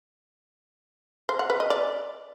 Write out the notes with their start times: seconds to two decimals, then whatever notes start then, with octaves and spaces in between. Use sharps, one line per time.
1.29 C5
1.39 F#5
1.50 B4
1.60 D#5
1.70 D5